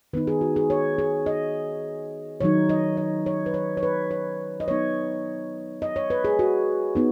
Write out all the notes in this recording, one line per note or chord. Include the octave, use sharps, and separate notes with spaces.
D#3 B3 D#4 B4
G#4
F#4
G#4
C#5
G#4
D#5
D#3 F#3 D#4 C#5
D#5
D#5
C#5
B4
C#5
C#5
B4
C#5
D#5
F#3 B3 D#4 C#5
D#5
C#5
B4
G#4
F#4
B3 D#4